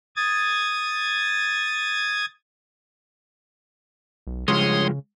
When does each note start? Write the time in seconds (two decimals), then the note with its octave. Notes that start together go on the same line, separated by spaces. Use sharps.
0.16 D#6 G#6 A6
4.27 B1
4.48 G2 C#3 F3 G#3 C#5 C6 D#6